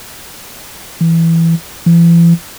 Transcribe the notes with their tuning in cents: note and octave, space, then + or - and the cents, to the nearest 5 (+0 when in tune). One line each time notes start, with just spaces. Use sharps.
E3 +5
E3 +40